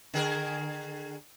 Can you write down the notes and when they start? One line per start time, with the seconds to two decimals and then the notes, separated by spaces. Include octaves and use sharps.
0.14 D3 G#4 A#4